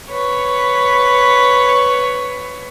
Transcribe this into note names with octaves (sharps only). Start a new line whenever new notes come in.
B4 C#5